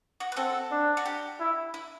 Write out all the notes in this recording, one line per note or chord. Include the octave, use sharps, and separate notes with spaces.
F#4
B4
C4 F#4 A4
D4
F#4
G4
E4
E4